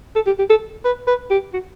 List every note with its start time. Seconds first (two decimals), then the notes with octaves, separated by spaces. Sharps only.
0.15 A4
0.27 G4
0.39 G4
0.50 A4
0.85 B4
1.07 B4
1.31 G4
1.53 F#4